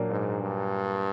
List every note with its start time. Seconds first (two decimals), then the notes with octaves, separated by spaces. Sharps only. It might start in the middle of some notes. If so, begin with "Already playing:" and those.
Already playing: A#2 F#3 A#3 D4
0.09 G#2
0.40 G2